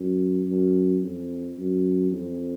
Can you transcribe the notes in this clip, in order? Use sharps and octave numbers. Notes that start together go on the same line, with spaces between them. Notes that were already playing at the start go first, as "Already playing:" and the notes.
Already playing: F#2
F#2
F2
F#2
F2